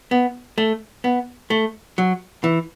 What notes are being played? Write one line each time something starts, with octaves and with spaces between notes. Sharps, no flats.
B3
A3
B3
A3
F#3
E3